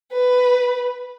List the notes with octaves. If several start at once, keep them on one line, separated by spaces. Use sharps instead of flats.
B4